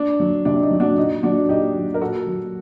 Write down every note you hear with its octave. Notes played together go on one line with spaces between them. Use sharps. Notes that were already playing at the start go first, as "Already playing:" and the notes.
Already playing: D4
F#3
C3 D4
D#4
F#3
D4 F#4
A#2 D#4
F#3 D4 F#4
A#2 D#4 G4
F#3
A#4
A#2 F#4 A4
F#3